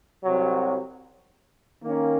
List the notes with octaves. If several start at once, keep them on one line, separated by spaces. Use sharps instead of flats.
C2 C3 F#3
D#3 A#3 C#4